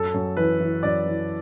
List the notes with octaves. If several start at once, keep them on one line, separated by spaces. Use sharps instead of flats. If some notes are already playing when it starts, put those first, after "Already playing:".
Already playing: F#2 A4
F#2
E3 B4
E3
F#2 D5
E3